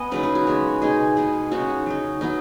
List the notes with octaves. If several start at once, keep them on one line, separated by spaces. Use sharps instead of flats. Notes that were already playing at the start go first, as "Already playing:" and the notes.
Already playing: B3 D#5 G#5
C#3 F#3 D#4 B4
G#4
F#4
C#3 G#3 B3
B2 G#3 D#4 G#4
B2 G#3 B3 G#4
C#3 G#3 D#4 F#4
F#3 D#4
F#3 B3 D#4